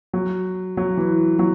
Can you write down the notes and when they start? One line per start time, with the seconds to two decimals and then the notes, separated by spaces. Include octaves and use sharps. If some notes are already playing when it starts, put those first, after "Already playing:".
0.14 F#3
0.77 F#3
0.97 E3
1.39 F#3